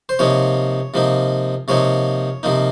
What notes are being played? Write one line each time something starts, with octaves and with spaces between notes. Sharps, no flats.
C5
C3 F3 A#3 D#4 C#5
C3 F3 A#3 D#4
C3 F3 A#3 D#4 C#5
C3 F3 A#3 D#4